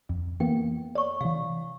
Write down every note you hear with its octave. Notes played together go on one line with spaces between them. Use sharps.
F2
E3 A#3 B3 G5
C#5 D5 C#6
C3 E3 F5